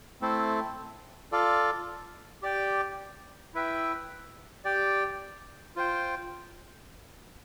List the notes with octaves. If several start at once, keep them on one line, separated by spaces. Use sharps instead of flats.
A3 C4 E4 A4 C5
F4 A4 D5 F5
G4 D5 G5
E4 B4 E5 G5
G4 D5 G5
F4 C5 G5